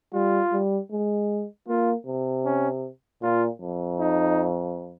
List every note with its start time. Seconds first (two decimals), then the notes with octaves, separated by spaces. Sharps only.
0.13 G3 F4
0.52 G3
0.91 G#3
1.68 A#3 F4
2.06 C3
2.45 C#4
3.22 A#2 F4
3.61 F2
4.00 D#4